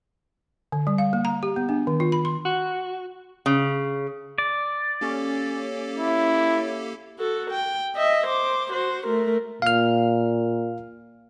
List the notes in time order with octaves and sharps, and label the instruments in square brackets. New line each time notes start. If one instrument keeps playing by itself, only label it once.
[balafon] D3
G3
F5
A#3
A#5
G4
B3
D4
D#3
F4
B5
C6
[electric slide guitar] F#4
[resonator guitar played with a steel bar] C#3
[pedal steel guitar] D5
[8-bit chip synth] A#3 G4 A4 [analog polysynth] C#4
[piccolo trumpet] E4
[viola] F#4 A4
G5
D#5 E5
C5 D6
F#4 C5
A3 A#4
[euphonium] A#2 [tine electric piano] F5 F6